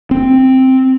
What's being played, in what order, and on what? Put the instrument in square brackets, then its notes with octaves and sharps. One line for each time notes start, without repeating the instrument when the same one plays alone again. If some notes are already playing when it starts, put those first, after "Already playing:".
[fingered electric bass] C4